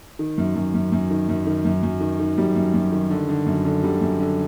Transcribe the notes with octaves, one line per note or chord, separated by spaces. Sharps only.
D#3
F#2
F#2
F#2
F#2
D#3
F#2
D#3
F#2
F#2
D#3
D#3
F#2 G3
F#2
F#2
D#3
D3
D3
F#2
D3
D3 G3
F#2
D3